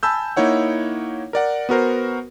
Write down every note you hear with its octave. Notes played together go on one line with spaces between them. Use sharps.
G#5 A5 B5 E6 G6
A#3 D#4 E4 C#5 F#5
A#4 D5 F#5
B3 F#4 A#4 C5